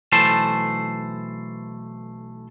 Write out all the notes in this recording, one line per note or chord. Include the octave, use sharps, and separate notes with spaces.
B1 E3 A3 C5 A5